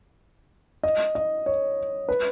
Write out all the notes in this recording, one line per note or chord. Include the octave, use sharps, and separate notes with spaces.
D#5
D#5
C#5
B4